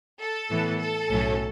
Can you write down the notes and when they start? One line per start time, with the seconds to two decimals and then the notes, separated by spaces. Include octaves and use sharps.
0.20 A4
0.50 A2 E3 B3
0.80 A4
1.10 B1 A2 F#3 A3 C#4